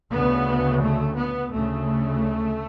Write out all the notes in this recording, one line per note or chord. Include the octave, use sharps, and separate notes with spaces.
D2 C#3 B3
A3
B3
D2 C#3 A3